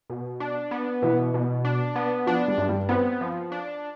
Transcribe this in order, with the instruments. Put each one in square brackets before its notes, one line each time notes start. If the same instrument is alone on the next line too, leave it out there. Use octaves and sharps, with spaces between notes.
[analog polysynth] B2
D4
B3
[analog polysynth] B2 [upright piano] E3
[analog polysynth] B2
D4
B3
[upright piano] F3 [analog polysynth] D4
[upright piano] G3
[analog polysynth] G2
[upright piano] G3
[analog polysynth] B3 [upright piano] C4
[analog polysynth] F3
D4